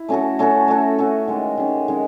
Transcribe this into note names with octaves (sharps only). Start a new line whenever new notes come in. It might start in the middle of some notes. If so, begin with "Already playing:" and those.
Already playing: E4
A3 C#4 F#4 A4
A3 C#4 F#4 A4
A3 C#4 F#4 A4
A3 C#4 F#4 A4
D#3 G#3 C#4
D#3 G#3 C#4
D#3 G#3 C#4